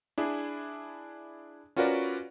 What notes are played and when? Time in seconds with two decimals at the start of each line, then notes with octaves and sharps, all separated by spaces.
0.18 D4 E4 G#4
1.76 C#4 F4 F#4 A#4 B4 D5